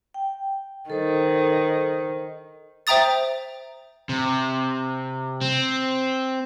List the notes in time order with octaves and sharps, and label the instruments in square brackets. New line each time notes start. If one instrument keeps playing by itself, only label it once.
[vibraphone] G5
[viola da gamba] D#3 [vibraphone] A4 C5
[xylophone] C5 E5 G5 A#5 D#6 A6
[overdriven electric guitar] C3
C4